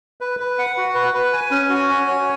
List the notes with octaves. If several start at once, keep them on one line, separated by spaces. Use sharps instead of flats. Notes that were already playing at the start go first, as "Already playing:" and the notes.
B4
B4
F#5
F#4
B4
B4
G#5
C#4
F#4
G#5
C#5